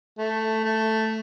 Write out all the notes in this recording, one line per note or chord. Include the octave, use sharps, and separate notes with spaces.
A3
A3